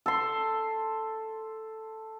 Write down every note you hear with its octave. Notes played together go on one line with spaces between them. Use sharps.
A4 C6